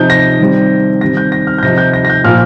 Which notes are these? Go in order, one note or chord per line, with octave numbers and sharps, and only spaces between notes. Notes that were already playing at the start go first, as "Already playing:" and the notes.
Already playing: C3 F3 D#4 G6
A#6
D#3 G3 C4
D#3 G3 C4 A#6
G6
A#6
F6
G6
C3 F3 D#4 A#6
G6
A#6
A#6
G6
A#2 F3 A#3 F4 F6